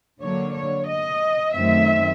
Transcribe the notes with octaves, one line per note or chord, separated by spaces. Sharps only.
D3 F#3 A#3 D4 C#5
C#5
D#5
F#2 D#3 F#3 A3 C4 E5